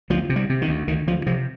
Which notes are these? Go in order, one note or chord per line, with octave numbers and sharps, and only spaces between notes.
D2 F3
C3
G3
C3
D#3
D2
D2 D#3
D2 F3
C3 F3